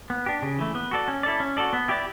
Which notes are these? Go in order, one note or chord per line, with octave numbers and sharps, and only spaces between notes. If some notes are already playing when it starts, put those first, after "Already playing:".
B3
D4 G4
C#3
E3 A3
B3
F#4 A4 D5
C#4
E4 A4 D5
C#4
F#4 A4 D5
B3
E4 G4 D5